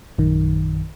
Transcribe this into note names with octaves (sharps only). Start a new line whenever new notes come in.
A#1 F#2 D#3